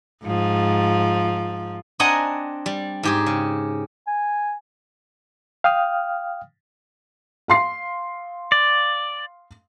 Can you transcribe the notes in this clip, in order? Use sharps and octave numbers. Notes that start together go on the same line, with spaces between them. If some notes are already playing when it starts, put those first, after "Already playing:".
G#2 F3
C4 D4 D#5 F#5 G#5 A#5
G3
G#2 G4 G#4
C#3
G#5
F5 G5 D#6 F6
F5 C6 C7
D5